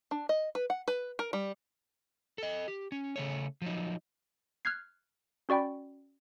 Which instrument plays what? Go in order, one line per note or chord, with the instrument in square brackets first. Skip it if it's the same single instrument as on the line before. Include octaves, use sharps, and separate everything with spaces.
[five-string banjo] D4
D#5
B4
F#5
B4
A#4
G3
[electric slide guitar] A4 D#5
G4
C#4
C#3 A3 C#5
F3 F#3 D#4
[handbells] F6 F#6 G#6 C7
C#4 F#4 D5 G5 B5